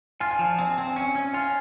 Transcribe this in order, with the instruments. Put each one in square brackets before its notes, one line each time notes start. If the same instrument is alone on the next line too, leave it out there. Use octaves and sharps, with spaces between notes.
[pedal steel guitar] F4 [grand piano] G#5
[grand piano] G#5
[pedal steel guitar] F3 [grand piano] A5
[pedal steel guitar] C4 [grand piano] G#5
[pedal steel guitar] C4 [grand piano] G#5
[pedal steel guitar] C#4 [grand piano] G#5
[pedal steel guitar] C#4
[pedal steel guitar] F4 [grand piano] G#5